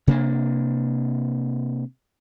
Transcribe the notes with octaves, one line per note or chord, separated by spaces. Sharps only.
C3 A#3 D4